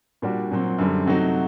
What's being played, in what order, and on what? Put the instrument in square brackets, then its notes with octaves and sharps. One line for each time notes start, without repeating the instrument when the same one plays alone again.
[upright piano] A#2 G3 D4 F#4
A#2 F#3 C4
F#2 D3 G3 C4
C3 F#3 A3 D#4 F#4